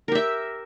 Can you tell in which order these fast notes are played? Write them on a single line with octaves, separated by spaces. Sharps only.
A#4 G4 E5